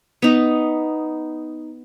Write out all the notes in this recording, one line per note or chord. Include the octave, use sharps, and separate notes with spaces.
B3 D#4